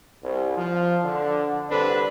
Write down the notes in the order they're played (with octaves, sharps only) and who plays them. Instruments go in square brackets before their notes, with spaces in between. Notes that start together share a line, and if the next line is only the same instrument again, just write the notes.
[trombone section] C2
F3
D3
C2 D3 C4 D4 A4 B4